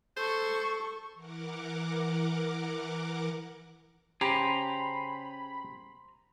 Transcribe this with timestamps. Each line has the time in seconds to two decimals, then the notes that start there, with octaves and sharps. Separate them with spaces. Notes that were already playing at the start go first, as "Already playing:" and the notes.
0.17 A4 C5 C#6
1.14 E3 A#4 F#5 D6
4.21 C#3 G4 C5 G#5 A#5 B5